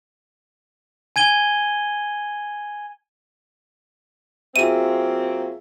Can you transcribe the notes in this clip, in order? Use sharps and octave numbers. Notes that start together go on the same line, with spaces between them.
G#5 G#6 D#7 G7
F#3 A#3 C4 F4 G#4 E5 D#7